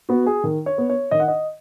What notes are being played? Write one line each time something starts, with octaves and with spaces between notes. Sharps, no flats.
B3 F#4
G#4
D#3
C#5
B3
C#5
D#3 D#5
F#5
D#5